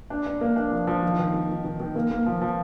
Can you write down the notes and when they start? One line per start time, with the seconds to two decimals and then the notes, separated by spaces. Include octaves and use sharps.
0.10 D4
0.26 D4
0.41 A#3
0.56 D4
0.71 F3
0.87 F3
1.03 D#3
1.18 D#3
1.34 D#3
1.49 D#3
1.64 D#3
1.80 D#3
1.95 A#3
2.11 A#3
2.26 F3
2.41 F3